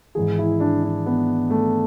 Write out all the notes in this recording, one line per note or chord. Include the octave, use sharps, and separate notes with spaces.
G#1 G#2 E3 G#4
E4
D4
D4
B3
A3